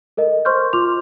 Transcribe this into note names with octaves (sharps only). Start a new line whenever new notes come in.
A4 A#4 D#5
C5 C6 C#6 F6 G6
F4 C6 D6 F7